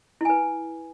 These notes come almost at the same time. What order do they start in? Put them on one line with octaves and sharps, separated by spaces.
E4 G#5 B4